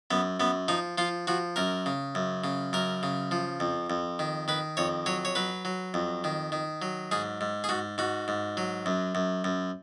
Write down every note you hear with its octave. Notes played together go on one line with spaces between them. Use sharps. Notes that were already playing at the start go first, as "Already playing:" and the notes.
F#2 B3
F#2 B3
F3 D#4
F3 F4
F3 F#4
F#2 A#4
C#3
F#2
C#3
F#2 A#4
C#3
F3
F2
F2
D#3
D#3 B4
F2 C#5
F#3 C#5
C#5
F#3 B4
F#3
F2
D#3
D#3
F#3
G#2 G#4
G#2
G#4
G#2 F#4
G#2 F#4
G#2
F#3
F#2
F#2
F#2